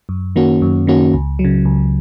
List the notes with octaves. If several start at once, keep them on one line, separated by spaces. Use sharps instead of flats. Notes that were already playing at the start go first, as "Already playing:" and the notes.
F#2
D#3 A#3 C#4 F#4
F#2
D#3 A#3 C#4 F#4
C#2
F#3
C#3
C#2